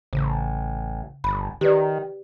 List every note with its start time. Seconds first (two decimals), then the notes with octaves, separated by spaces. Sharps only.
0.13 A1 C#3
1.24 G1 B5
1.61 D#3 G4 B4 D5